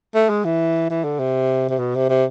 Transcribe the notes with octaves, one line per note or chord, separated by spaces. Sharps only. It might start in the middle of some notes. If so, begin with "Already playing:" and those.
A3
G#3
E3
E3
D3
C3
C3
B2
C3
C3